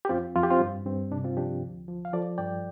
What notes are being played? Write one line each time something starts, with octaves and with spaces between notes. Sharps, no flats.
G4
F2 C4 F4
F2 F4
G4
C4 F4
G2
G2 C4
C3 D4
C4 F4
F3 D4 G4
D2
F3
F5
F3 A4 D5
G2 D5 G5